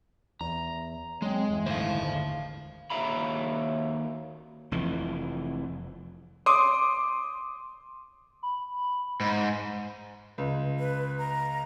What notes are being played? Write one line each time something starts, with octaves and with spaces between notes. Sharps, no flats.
E2 A#5
F#3 G#3 C4
G1 E2 E3
D2 A2 D#3 C5 F5
D#2 F#4 E5 F5 A#5 B5
F1 F2 E3
C6 D6 D#6
B5
G#2
C#2
B4
A#5